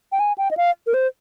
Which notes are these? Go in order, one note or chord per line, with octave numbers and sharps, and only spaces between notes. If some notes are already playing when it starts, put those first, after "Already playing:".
G5
G#5
G5
D#5
F5
A#4
C5